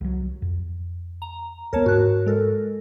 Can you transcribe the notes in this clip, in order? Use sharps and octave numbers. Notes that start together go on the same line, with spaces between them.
C2 F#3
F2
A#5
D#2 B3 A#4 C#5 A5
G#2 F#4 F#6
G#3 A4 A#4